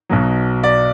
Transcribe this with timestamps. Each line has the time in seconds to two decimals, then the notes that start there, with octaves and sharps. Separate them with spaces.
0.09 B1 B2 F#3
0.63 D5